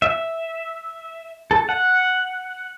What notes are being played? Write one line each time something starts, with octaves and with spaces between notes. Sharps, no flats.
E5
A4
F#5